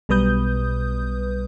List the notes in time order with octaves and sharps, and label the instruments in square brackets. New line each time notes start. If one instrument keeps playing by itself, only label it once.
[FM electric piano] B1 B2 G3 B4 D#6 G6